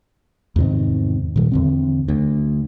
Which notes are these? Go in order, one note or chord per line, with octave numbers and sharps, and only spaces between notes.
E2 G#2 C3 D#3
A#2 D#3 G3
E2 D3 C4
D2